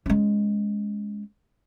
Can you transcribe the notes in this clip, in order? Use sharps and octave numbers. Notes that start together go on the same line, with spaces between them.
G#3 C#4